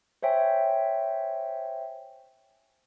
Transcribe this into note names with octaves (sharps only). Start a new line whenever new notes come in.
C5 C#5 E5 G5 G#5